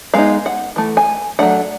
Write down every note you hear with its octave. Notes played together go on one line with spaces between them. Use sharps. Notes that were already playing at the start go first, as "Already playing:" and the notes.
G#3 B3 D#4 F5
F#5
E3 A3
G#5
F#3 A3 D4 F#5